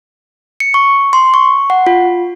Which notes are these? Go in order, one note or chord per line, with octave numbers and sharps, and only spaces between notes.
C#7
C#6
C6
C#6
F#5
F4